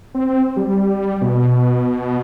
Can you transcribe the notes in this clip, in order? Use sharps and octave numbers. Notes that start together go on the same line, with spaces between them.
C4
G3
B2